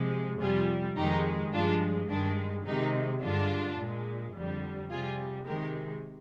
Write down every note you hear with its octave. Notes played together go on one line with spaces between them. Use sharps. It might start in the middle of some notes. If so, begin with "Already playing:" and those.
Already playing: C3 F3 G#3
F2 C3 G3 F4 G#4
F2 D#3 G#3 D#4 G4
G2 F3 G#3 D4 F4
G2 D#3 G#3 D4
C3 D#3 G#3 D#4
G2 D3 G#3 D4 F4
A#2 G#3
F2 D3 G3
C3 G3 F4 G#4
C3 D#3 G#3 G4 A#4